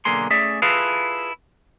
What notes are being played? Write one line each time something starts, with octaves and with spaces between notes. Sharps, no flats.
B1 D3 A#3 G#4 C6
A3 C#4 G#4 D5 E5
E4 F4 G#4 A4 B4 F5